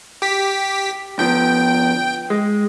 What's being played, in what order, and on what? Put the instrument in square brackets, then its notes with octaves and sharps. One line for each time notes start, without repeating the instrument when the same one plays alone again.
[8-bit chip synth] G4 B6
[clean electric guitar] D3 F3 B3 [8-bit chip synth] G5
[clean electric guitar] G#3